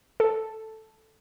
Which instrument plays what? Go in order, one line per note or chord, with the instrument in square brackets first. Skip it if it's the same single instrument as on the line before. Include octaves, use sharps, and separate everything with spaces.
[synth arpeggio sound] A4